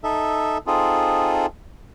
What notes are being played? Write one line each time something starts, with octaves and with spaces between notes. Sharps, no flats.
D#4 A4 E5
C4 D#4 F4 G#4 A4